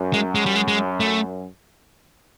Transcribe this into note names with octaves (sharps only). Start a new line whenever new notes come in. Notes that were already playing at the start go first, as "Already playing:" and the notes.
Already playing: F#2
G#3
G#3
G3
G#3
G#3
A3